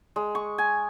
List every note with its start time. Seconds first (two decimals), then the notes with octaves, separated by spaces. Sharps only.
0.16 G#3
0.35 C#6
0.58 G#5